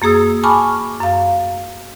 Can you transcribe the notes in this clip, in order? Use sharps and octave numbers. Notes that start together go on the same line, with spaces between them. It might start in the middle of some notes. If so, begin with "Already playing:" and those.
F#2 A#3 G#4 D#6 E6
G#5 A5 B5 C#6 D6 F6
F#2 F5